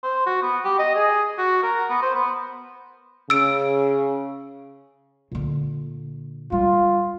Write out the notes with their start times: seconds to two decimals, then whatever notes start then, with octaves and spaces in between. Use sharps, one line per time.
0.03 C5
0.26 F#4
0.42 B3
0.64 G4
0.79 D#5
0.95 G#4
1.38 F#4
1.63 A#4
1.90 B3
2.02 C5
2.15 B3
3.30 C#3 E6 D7
5.32 A#2 D3
6.52 G3 F4